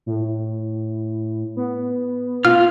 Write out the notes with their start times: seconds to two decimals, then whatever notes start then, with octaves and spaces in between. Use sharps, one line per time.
0.06 A2
1.57 B3
2.45 F4 F6